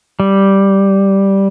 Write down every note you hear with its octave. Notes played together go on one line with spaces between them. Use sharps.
G3